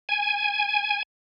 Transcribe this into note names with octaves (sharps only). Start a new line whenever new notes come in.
G#5